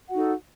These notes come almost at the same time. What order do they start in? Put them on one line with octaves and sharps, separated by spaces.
F#5 F#4 D#4 A4